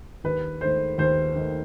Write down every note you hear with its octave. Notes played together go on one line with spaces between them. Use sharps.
D#2 B4
D#3 A3 C5
D#2 C5
D#3 A3